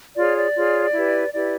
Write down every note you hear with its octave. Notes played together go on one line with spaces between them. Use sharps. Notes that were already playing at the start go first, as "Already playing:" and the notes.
F4 G#4 C#5 D5
D5
F4 G#4 C#5
E4 G4 B4
E4 G4 B4 D5